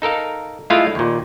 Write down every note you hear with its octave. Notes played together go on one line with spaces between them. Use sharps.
D#4 A4 A#4 F5
G#3 A3 E4 F4 F5
D#2 A#2